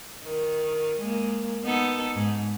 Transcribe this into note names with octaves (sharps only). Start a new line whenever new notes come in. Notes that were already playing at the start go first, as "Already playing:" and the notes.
D#3
G#3 A#3
B3 D#4 A4
G#2